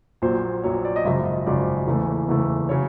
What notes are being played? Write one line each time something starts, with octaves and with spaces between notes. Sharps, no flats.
A#1 A#2 F#3 C5
A#1 A#2 F#3 C#5
D5
D#5
G#1 F#2 C#3 F3 E5
D#5
G#1 F#2 C#3 F3 D5
F#1 E2 C#3 E3 A3
F#1 E2 C#3 E3 A3
C#3 F#3 C#5